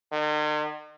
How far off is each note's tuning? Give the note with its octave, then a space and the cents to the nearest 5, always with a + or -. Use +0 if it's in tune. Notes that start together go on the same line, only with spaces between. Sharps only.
D#3 -45